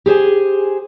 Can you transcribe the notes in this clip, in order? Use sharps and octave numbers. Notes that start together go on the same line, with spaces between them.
G4 G#4 C5 G#5